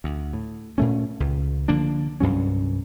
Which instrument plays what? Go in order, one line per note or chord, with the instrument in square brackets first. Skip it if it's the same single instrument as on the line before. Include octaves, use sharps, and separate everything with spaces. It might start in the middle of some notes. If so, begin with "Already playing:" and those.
[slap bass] D2
A2
A#2 A3 C#4
C#2
D3 F3 A#3 D4
C2 G2 F#3 C#4